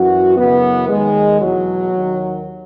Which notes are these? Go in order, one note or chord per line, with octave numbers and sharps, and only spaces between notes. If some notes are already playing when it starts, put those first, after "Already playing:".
Already playing: F#2 E3 F#4
F#2 C#3 E3 B3
D#2 D#3 G#3
E2 B2 F#3
D#2 D#3